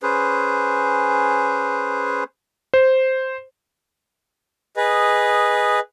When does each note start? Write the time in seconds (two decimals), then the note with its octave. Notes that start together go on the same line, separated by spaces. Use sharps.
0.02 C#4 G#4 B4 C5
2.74 C5
4.77 G#4 B4 D#5